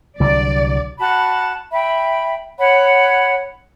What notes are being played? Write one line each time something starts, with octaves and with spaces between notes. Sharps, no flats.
C2 D3 F#3 D5
F#4 A5 B5
E5 G5 B5
C#5 F#5 B5